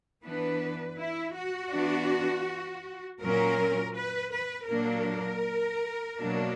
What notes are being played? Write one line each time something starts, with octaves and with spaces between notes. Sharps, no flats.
E3 B3 D4 B4
E4
F#4
E3 B3 D4
A#2 F#3 C#4 A#4
B4
B4
A#2 F#3 A#3 D4 A#4
B2 F#3 A#3 D4